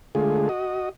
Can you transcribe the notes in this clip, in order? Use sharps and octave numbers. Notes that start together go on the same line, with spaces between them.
D3 G#3 A3 F4 G#4
F#4 D#5